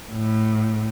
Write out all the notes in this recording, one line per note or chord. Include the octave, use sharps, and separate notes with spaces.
A2